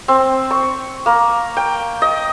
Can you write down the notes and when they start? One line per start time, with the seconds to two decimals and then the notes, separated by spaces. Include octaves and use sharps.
0.08 C4
0.51 C#6
1.06 A#3
1.57 G5
2.02 D#5